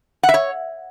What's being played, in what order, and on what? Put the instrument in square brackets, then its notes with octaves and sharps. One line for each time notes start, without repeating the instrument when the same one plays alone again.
[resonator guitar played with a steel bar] F#5
E5
C#5